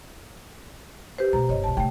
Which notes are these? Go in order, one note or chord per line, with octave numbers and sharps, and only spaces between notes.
G4 B4 C5
B2 A3 A#5
G1 C#5 D#5
B1 E2 A5
C2 A2 A3 G5